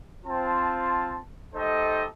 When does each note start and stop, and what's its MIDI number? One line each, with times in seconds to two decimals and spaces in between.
0.25 1.18 60
0.25 1.18 65
0.25 1.18 81
1.55 2.06 57
1.55 2.06 63
1.55 2.06 67
1.55 2.06 69
1.55 2.06 72
1.55 2.06 75